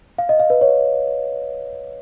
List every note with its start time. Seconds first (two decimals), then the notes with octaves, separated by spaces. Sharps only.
0.18 F5
0.29 D#5
0.39 F5
0.50 B4
0.61 C#5